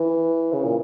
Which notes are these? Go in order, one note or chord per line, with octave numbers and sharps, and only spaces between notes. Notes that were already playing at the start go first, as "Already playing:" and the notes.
Already playing: E3
C#3
A#2